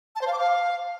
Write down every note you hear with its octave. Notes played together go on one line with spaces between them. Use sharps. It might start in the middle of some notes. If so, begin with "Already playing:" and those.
A5
C5
F5
D6
F5